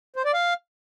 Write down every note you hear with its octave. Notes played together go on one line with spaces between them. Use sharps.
C5
D5
F5